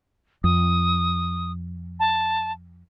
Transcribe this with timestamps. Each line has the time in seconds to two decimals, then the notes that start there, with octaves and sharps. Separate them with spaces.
0.44 F2 D#6
2.00 A5